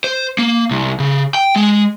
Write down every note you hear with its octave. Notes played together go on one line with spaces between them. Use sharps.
C5
A#3
C2
C#3
G5
G#3